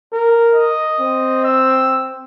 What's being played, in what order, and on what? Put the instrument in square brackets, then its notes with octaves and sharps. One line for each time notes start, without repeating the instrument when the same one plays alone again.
[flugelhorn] A#4
[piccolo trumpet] D#5
[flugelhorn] C4
[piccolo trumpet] E6